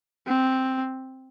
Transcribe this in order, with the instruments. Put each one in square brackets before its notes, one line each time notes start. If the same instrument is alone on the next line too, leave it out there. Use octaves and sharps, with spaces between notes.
[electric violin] C4